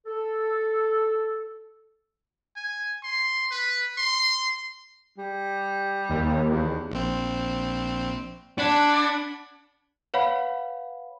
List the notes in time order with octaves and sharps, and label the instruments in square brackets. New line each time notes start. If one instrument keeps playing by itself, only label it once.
[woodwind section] A4
[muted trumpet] G#5
C6
B4
C6
[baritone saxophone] G3
[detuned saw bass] D#2
[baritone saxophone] E2
[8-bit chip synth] A#1 C4
[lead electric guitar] D4 [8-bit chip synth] F#5 B5 G#6
[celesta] B4 C#5 F5 F#5 B5